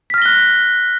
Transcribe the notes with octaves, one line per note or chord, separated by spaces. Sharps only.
F6 F#6 A#6 B6 G7